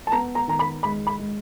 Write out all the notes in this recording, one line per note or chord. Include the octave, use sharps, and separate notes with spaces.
A5
B3 A#5
A#5
D#3 A#5
B5
G#3 B5
B5
G#3